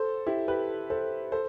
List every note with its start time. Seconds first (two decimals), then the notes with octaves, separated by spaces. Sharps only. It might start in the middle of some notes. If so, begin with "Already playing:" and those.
Already playing: A4 C5
0.27 E4 G4
0.48 G4 B4
0.90 A4 C5
1.32 A4 C5